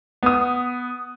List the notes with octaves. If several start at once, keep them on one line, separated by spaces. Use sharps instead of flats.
B3 D#6